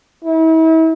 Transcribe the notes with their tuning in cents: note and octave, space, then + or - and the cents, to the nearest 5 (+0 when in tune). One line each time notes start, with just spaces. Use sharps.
E4 -40